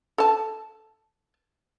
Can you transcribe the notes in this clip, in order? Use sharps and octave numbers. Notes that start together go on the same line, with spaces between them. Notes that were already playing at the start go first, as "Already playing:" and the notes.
A4 A5